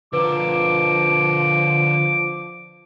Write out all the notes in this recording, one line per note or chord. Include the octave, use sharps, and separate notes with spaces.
D3 F3 A#4 B4 D6